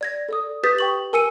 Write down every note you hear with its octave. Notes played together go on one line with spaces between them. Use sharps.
D5 G#6 A#6
A4 D5 D#6
G4 B4 D#6 G6 A6 B6
G5 C#6 F#7
A#4 G#5 E6 C#7 D#7